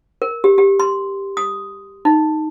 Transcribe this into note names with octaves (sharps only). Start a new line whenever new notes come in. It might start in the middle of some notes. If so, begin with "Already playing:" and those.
A#4
G4
G4
C6
D#6
D#4